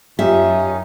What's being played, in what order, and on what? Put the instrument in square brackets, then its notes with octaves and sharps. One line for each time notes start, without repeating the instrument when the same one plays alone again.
[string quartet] F#2 [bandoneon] C#4 D#4 [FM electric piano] F4 G4 [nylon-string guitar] E5